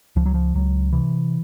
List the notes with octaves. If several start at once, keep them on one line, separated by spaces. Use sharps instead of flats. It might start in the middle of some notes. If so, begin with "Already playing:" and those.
C#2 F3
F#3
F3
C#2 F#3
C3 E3